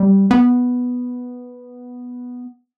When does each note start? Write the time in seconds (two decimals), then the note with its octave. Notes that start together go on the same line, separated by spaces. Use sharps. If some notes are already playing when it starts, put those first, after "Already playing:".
Already playing: G3
0.31 B3